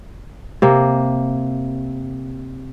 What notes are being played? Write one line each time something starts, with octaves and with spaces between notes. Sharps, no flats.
C3 A#3